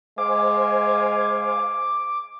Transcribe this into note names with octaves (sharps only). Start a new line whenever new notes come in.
G#3 C5 F5 G#5 D6